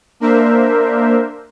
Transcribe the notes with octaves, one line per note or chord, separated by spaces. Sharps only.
A#3 D4 A#4 C5 E5